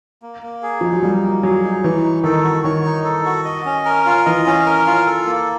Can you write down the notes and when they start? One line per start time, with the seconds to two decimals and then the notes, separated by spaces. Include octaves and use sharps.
0.22 A#3
0.42 A#3
0.63 G#4
0.81 F3 D#4
0.93 F#3
1.03 G3 A#3
1.23 A#3
1.43 F#3 G#4
1.64 D#4
1.83 E3 C#5
2.04 D#4
2.24 D#3 A4
2.44 F#4
2.64 D#3 C#5
2.85 D#4
3.05 A4
3.25 F#4
3.45 D#5
3.65 C#4
3.85 A#4
4.06 F4
4.26 E3 D#5
4.46 C#4
4.66 A#4
4.87 F4
5.07 A4
5.26 A#3